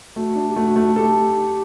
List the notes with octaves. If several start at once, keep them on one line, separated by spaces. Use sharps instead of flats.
A3 F#4
D4
G4
A3 F#4
A3
G4 A4